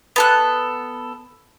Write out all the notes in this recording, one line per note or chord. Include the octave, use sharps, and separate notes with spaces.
B3 A4 F#6